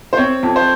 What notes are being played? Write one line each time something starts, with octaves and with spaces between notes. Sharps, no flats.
C5
C4 C#5
F2
C5